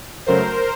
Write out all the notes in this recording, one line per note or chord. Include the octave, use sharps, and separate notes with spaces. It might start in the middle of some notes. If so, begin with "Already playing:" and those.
F#2 C#3 F#3 A3 A#4 C5